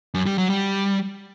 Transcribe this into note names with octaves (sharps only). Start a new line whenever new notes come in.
F#2
G3
F#3
G3